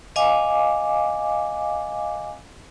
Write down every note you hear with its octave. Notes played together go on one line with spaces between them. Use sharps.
D#5 F5 G#5 D6